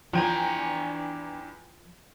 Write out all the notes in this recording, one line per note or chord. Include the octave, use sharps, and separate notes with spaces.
E2 F3 D4 G5 G#5 A#5